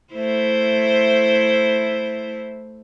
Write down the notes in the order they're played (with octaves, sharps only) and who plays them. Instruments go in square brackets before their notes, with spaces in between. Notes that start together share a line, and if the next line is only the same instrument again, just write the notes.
[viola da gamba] A3 E4 C5